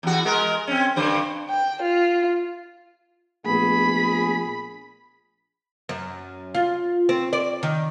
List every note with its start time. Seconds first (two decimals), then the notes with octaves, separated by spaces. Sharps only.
0.03 E2 F#4
0.25 G#3 A#4
0.67 C4 C#4
0.96 G2 D3 C5
1.50 G5
1.82 F4
3.46 A#1 A3 B3 G#4 B5
5.89 F#2
6.55 F4
7.09 C4
7.33 D5
7.63 D#3